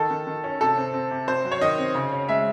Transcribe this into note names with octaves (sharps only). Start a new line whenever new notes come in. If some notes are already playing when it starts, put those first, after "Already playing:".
Already playing: D#3 A4
D#3
D#3
C#4
C3 A4
C4
C4
C3
C4 C5
F#3
C#5
D#3 D#5
C4
C#3
C#4
G#3 E5